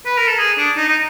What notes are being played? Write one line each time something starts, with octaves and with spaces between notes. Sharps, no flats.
B4
A#4
A4
G#4
D4
D#4
D#4